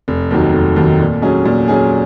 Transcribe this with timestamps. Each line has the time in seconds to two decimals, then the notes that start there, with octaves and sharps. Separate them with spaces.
0.08 F1
0.31 D#2 D#3 F#3
0.54 F1
0.76 D#2 D#3 F#3
1.00 A#2
1.22 F#3 C#4 G#4
1.45 A#2
1.68 F#3 C#4 G#4